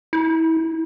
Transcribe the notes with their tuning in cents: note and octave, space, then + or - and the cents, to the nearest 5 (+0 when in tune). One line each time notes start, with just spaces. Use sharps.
E4 -25